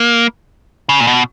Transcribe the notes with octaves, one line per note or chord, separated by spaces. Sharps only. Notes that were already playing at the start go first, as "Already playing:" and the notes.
Already playing: A#3
C#3
A#2
B2